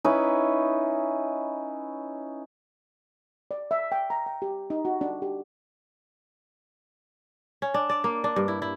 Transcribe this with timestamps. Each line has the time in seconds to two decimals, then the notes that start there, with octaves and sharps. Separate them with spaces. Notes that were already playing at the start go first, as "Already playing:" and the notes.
0.05 C#4 D#4 E4 B4
3.51 D5
3.71 E5
3.92 G5
4.10 A#5
4.26 G5
4.42 G4
4.70 D#4
4.85 F#4
5.01 D4
5.22 G4
7.62 C#4
7.74 D4
7.90 D5
8.04 A#3
8.24 D4
8.36 G2
8.48 E4
8.62 E4